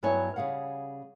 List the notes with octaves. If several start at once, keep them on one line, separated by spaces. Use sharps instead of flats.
G2 F#3 B3 E4 C#5 G#5
C#3 G3 G#4 F5 F#5